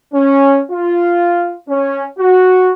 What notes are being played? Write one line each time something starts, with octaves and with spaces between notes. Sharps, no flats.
C#4
F4
C#4
F#4